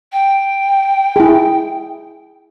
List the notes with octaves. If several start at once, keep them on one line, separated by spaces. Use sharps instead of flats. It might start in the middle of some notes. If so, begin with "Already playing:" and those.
G5
E4 G#4